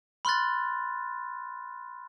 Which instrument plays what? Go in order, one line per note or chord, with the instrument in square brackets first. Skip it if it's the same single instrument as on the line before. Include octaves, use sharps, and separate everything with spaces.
[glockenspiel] B5 C6 F6 F#6 A6